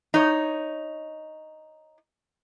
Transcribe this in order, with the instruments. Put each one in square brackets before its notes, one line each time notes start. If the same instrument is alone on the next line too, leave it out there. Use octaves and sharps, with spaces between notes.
[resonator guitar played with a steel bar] D#4 C#5